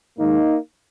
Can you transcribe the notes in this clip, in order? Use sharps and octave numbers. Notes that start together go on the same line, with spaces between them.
G#2 D#3 G#3 A#3 D#4